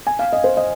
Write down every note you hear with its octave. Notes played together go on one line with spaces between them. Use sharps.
G#5
F5
D#5
C5
D#5